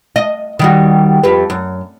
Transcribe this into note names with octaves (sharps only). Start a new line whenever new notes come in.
D#5
D#3 G3 F#4
F2 G4 B4
F#2